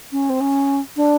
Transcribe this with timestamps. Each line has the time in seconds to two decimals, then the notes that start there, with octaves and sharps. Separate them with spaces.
0.12 C#4
0.30 C4
0.41 C#4
0.96 D4